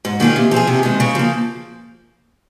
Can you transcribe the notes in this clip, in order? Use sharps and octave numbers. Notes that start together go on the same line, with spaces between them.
G#2
D#3 A#3 F4 G#4
C3
F3 C4 F4 G#4
C3
D#3 G#3 C4
C#3
F3 A#3